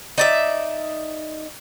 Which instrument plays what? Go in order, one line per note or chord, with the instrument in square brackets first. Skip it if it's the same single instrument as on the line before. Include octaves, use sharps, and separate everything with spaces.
[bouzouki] D#4 D5 E5